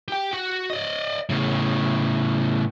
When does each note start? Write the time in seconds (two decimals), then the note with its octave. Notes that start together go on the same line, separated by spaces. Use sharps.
0.08 G4 G5
0.33 F#4
0.70 D5 D#5
1.29 A2 C#3